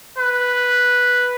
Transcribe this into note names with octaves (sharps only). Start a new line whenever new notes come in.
B4